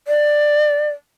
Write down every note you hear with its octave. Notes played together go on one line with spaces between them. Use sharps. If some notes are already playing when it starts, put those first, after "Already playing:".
D5